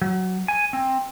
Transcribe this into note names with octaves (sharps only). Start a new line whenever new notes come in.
F#3
G#5
C4